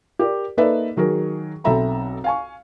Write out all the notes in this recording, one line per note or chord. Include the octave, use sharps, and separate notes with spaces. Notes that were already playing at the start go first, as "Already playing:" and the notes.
G4 A#4 D5
A#3 D#4 A4 B4 D5 E5
D#3 F#3 G#4 A#4
B1 C4 A4 E5 A#5 B5
F5 G#5 C#6